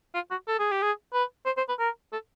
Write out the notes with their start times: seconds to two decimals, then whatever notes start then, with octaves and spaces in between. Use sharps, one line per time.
0.14 F4
0.31 F#4
0.48 A4
0.59 G#4
0.71 G4
0.82 G#4
1.13 B4
1.45 C5
1.57 C5
1.69 B4
1.79 A#4
2.12 A4